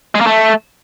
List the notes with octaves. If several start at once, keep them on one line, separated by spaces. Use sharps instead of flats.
G#3
A#3
A3